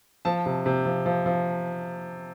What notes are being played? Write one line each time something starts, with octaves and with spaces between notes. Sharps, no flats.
F3 A5
C3
C3
F3
F3
F3